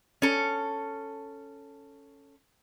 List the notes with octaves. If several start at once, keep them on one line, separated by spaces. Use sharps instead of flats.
C#4 A4